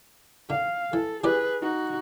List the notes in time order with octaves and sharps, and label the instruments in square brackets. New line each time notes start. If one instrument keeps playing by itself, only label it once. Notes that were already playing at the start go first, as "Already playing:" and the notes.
[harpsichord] D3 [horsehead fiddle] F5
[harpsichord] E3 [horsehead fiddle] A4
[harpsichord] E3 G4 D5 [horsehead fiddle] G#4 B4
[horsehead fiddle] D#4 F#4